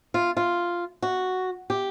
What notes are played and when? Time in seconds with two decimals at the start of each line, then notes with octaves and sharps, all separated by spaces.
0.14 F4
0.37 F4
1.03 F#4
1.70 G4